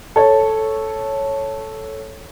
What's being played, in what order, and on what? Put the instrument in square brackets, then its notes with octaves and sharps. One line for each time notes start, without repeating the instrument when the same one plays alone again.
[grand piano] A4 C#5